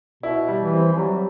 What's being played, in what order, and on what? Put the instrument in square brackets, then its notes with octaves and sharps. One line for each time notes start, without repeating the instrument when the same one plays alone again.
[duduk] B2 [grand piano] E4
[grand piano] G3
[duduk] E3
[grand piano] C4
[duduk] E3
[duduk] F#3 [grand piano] G3